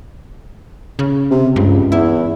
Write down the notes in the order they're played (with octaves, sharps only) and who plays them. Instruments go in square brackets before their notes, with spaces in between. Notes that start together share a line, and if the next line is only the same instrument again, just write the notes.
[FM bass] C#3
[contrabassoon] C3
[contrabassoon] C#2 [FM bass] G2
[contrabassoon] E2 [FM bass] E4